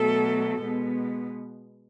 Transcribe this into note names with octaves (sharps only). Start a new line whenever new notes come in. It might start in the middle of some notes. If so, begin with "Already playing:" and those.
Already playing: B2 F#3 A3 A4
B2 G#3 B3